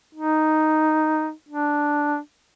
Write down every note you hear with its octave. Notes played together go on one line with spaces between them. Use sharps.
D#4
D4